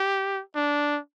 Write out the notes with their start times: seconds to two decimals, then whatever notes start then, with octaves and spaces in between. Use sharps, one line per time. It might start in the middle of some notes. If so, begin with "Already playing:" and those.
Already playing: G4
0.56 D4